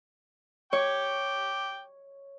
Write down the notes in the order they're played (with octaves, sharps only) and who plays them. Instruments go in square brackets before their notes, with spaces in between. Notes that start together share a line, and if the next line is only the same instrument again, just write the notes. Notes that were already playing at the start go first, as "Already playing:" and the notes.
[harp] C#5 [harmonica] G5 D6